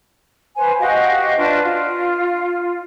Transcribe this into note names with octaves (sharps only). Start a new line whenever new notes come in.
B4 C5 G#5
F#4 G4 D#5 F5
D4 F4 B4 C5
F4